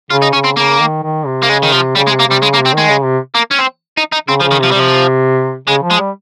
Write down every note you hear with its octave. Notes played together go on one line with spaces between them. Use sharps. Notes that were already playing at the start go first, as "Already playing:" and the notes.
C#3 F4
D#4
C#3 C#4
C4
C#3 A#3
D#3
D#3
C3
A#3
C#3 G#3
D#3
C3 F3
C#3 G3
G#3
C3
A#3
C3 G3
C#3 G#3
A#3
C3
C4
D#3 G#3
C#3
C3
A#3
C#4
C4
D#4
D#4
C#3 C4
F3
C#3
D#3
C3 F3
C3 G3
F3
C#3 G#3
F3
G#3
G3